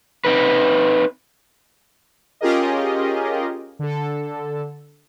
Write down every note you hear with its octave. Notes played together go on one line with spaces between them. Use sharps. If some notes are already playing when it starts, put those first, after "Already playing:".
C4 D#4 B4
C#4 F4 G4 G#4 A#4 D#5
D3 A4